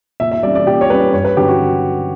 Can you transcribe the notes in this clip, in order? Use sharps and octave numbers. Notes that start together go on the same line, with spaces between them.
A#2 E5
E5
G3 C#4 D5
D5
A#2 G4
C#5
G3 C#4 B4
G2 C#5
B4
D3 F#3 C#4 G4
F#4